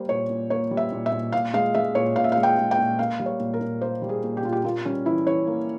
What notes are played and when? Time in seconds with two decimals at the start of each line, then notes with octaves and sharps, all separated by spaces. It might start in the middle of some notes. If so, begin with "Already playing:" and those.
Already playing: G3 A#3 C5
0.09 A#2 C#5
0.29 A#2
0.50 A#3 C#5
0.71 G3
0.77 E5
0.92 A#2
1.06 E5
1.12 A#2
1.32 A#2 F5
1.54 G#3 F5
1.75 G#3 E5
1.95 A#2 C#5
2.16 A#2 F5
2.24 E5
2.32 F5
2.37 G#3
2.43 G5
2.58 G#3
2.71 G5
2.79 A#2
2.99 A#3 F5
3.20 G3
3.26 C#5
3.40 A#2
3.54 A#4
3.61 A#2
3.81 A#3 C5
4.02 G3
4.09 G#4
4.23 A#2
4.37 G4
4.43 A#2 F4
4.53 G4
4.64 A#3 F4
4.85 G3 C#4
5.05 E3 E4
5.26 E3 C#5
5.47 A#3